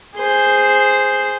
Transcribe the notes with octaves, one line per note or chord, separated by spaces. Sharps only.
G#4 C5